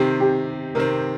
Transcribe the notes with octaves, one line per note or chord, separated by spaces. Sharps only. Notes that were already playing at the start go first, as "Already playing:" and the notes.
Already playing: C3 D#3 C4 G4
G4
C3 D#3 C4 A#4